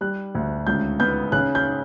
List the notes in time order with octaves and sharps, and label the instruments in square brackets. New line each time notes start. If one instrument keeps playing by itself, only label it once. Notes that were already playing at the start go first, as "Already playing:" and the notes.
[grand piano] G3 F#6
D2
C#2 G6
B3 G6
C#3 F#6
G6